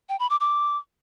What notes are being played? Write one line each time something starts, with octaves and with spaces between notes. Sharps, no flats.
G5
B5
D6
D6